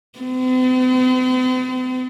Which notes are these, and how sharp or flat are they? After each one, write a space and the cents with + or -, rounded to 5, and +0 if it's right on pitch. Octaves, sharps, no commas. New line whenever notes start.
C4 -45